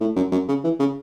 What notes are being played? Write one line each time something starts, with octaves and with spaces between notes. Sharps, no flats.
A2
F#2
F#2
C#3
E3
C#3